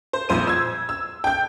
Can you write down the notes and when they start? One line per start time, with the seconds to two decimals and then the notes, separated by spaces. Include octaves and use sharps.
0.13 C5
0.29 A#1 F2 C5 D#7
0.47 E6 G#6
0.89 E6
1.24 G5 G6